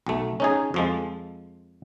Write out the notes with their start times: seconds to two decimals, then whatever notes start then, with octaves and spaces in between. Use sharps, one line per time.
0.07 B1 A3
0.40 C#4 D#4 G#4
0.74 F2 F3 G#3